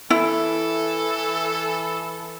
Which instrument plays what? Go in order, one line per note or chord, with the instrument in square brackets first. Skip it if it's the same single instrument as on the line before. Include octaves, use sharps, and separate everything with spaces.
[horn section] E3 A4 [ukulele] E4